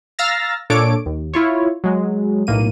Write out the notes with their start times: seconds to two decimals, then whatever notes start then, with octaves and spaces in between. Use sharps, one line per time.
0.19 F5 A#5 E6 F6 A6 A#6
0.70 A#2 D4 A4 C#5 D6 D7
1.06 D#2
1.34 E4 F4 C#5
1.84 F#3 G#3
2.47 B1 A2 A#3 D#7